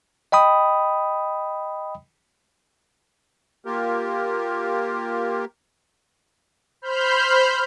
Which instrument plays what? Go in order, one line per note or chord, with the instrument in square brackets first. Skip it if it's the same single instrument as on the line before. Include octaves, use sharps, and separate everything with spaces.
[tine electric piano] D#5 G5 B5 D#6
[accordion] A#3 F4 G4 A#4
[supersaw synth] C5 B5 F6 G6